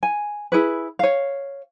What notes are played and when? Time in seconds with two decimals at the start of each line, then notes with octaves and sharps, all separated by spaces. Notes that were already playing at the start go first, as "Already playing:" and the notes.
0.03 G#5
0.52 E4 G#4 B4
0.99 C#5 F5